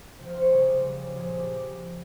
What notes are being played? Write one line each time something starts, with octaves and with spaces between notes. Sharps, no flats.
C3 F3 G5
C5 F5
C#5
C#3 G3 G#4
C#3 G3
A#2 F3 G#4
G4